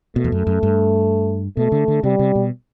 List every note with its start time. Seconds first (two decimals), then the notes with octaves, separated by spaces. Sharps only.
0.16 B2 A3
0.24 E2
0.32 F#2
0.47 F#2
0.63 G2
1.57 B2 A3
1.72 D3
1.88 D3
2.03 C3 G3
2.19 C3
2.35 B2